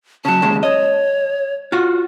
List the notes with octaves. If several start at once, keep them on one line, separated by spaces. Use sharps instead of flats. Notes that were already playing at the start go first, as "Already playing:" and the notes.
C#3 F#3 A5
D#2 C#3 G#3
C#5 D#5
F4 F#4